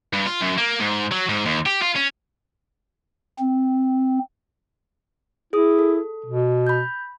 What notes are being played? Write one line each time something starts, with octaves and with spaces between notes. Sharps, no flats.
G2
F4
F#2
A#3
G#2
F#3
G#2
D#2
G4
F4
C#4
C4
E4 G#4 D#6
A4
B2
B5 G6